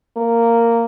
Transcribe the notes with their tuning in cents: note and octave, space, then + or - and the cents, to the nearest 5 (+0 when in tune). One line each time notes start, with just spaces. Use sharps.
A#3 -10